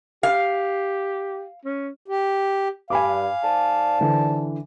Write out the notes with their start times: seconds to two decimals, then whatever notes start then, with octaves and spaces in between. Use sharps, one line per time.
0.23 G4 F5
1.65 C#4
2.08 G4
2.90 G2 F5 G#5 B5 D6
3.43 G#2 D5 A5
4.01 D3 E3